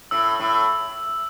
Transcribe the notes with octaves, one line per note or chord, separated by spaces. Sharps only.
A2 E6
A2